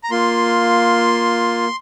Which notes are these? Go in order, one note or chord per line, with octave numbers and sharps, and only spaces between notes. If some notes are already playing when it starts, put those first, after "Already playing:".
A#5
A#3 F4 C6